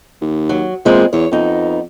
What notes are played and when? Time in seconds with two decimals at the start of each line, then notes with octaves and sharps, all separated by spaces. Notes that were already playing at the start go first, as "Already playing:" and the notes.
0.21 D#2
0.49 F#3
0.85 A#2 E3 G#3 C4
1.13 E2 C#5
1.31 F2 B3 D#4